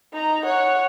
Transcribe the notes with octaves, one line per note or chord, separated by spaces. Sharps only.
D#4 A#5
C#5 F#5